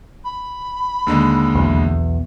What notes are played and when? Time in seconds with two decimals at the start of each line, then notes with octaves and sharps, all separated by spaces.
0.24 B5
1.07 D#2 D3 G#3
1.55 B1 E2